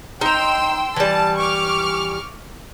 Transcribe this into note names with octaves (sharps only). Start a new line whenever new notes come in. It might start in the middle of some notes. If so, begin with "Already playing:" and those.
D#4 G5 A#5 C6 E6
E3 G3 A5
C#6 D6 F6